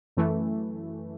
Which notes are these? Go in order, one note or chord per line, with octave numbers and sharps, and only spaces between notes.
F#2 E3 A3